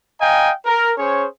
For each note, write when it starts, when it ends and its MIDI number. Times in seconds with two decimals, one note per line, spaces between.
0.21 0.51 75
0.21 0.51 77
0.21 0.51 79
0.21 0.51 80
0.21 0.51 82
0.66 0.92 70
0.98 1.26 61
0.98 1.26 68
0.98 1.26 72
0.98 1.26 73